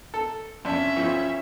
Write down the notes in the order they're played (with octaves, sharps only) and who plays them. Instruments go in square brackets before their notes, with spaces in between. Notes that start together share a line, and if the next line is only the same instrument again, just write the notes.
[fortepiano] A4
[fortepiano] F2 D4 [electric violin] C#4 E5
[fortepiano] B1 F3